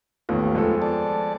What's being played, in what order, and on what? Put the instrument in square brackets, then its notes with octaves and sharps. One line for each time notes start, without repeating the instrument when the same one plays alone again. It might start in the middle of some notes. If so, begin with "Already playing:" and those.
[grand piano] A1 D#2 D#3 [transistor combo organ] A3 B3 F4
[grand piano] F2 G#3 A4
[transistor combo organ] D5 A5